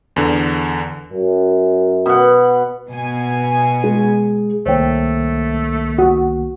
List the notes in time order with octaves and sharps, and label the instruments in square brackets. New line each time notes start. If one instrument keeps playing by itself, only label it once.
[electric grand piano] E2 D3
[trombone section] F#2
[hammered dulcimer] B2 F#5
[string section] B2 G#5
[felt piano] G#3
[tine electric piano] C2 D#3 A#3 [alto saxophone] A3 [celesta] C5 C#5 G5
[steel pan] F#4